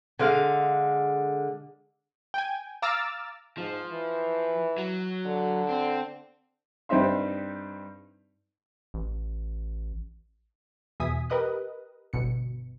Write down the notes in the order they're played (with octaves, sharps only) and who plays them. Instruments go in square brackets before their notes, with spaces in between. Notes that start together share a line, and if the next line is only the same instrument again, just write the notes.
[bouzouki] D3 G#3 F5
[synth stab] G5 G#5
F5 A#5 D6 E6 F6 A6
[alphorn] G#2 [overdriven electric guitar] F3
[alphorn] E3
[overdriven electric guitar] F#3
[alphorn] D3
[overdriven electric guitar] C4
[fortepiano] G2 G3 C4 D#4 E5 C6
[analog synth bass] A1
[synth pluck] E2 B2 E5 G#5 D#6 B6
G4 A#4 B4 D#5 D#6 F#6
G1 B2 C#7